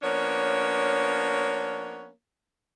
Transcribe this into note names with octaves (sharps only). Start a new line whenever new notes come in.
F3 A#3 B3 C#4 D4 C#5